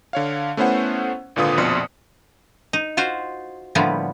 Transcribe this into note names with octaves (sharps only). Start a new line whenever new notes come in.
D3 C#5 F5
A3 B3 C#4 E4 C5 F#5
G#1 A#2 D3 F4 B4 D#6
A#1 F2 B2 D5 C6 C#7
D#4
F4 F#4 C5
A2 D3 F3 G3 A#3 B3